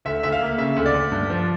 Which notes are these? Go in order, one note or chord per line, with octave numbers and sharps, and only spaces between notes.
D2 E5
D2 E5
F5
A#3
C#3 E5
D2
D5
D2
G2
F3